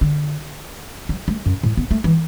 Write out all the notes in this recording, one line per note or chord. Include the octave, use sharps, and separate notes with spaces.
D3
F#3
A3
F#2
A2
B3
A3
E3